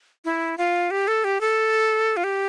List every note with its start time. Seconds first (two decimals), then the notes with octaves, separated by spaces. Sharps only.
0.25 E4
0.58 F4
0.91 G4
1.08 A4
1.24 G4
1.41 A4
2.17 F4
2.24 G4